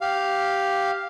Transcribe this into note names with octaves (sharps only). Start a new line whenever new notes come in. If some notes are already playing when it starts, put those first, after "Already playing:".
G4 F5